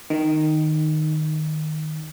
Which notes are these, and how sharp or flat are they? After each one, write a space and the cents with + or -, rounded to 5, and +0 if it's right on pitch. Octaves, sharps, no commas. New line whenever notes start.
D#3 -10 D#4 +10